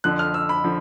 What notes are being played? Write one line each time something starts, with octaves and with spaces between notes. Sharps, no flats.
F2 D3 F3 F#6
F6
E6
B5
D3 F3